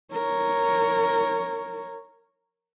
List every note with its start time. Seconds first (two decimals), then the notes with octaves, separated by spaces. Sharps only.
0.13 A#4 C#5